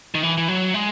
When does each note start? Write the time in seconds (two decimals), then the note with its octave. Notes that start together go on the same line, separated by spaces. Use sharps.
0.15 D#3
0.23 E3
0.37 E3
0.48 F#3
0.74 G#3